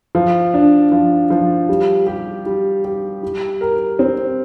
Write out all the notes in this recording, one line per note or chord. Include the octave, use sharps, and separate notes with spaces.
F3
D4
F3
F3
G3
G4
G3
G4
G3
A#4
C4